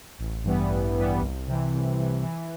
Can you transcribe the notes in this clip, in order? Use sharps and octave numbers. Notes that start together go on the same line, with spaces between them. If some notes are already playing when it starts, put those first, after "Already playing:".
A1
G2 E3 G3 B3
A1
G2 E3 G3 B3
C2
C3 E3
C2
C3 E3
E3